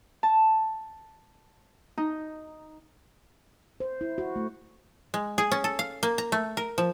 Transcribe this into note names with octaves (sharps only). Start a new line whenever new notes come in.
A5
D#4
C5
E4
F#4
A3
G#3
G#4
C#4
A4
F5
A#3
A#5
A3
A#4
F3